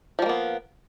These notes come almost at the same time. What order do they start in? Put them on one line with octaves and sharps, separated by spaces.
F3 G3 A#3 B3